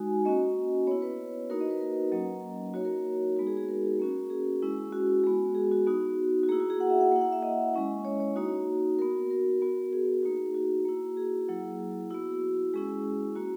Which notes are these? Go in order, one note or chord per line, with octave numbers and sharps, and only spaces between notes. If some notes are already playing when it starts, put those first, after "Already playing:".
Already playing: G#3 D#4 F#4 G#5
A#3 C#4 F#4 D#5
B3 E4 C#5
B4
A#3 D#4 F#4 A#4
D#5
B4
A#4
F#3 A#3 C#4 D#5
A#3 D#4 F#4 C#5
A#4
G#3 B3 D#4 F#4
G#4
G#4
A#4
A#3 C#4 F#4
G#4
G#3 C#4 E4
F#4
G#3 B3 F#4
G#4
F#4
B3 D#4 F#4
F#4
A#3 E4 G#4
F#4
G#4
F#5
E5
F#5
A#3 E4
F#5
E5
D#5
G#3 C#4 E4
C#5
C#5
A#3 D#4 F#4
B3 F#4 A#4
A#4
B3 F#4
G#4
A#3 D#4 F#4
F#4
A#3 E4
G#4
F#3 A#3 E4
B3 E4 F#4
G#3 C#4 E4 G#4
A#3 E4 F#4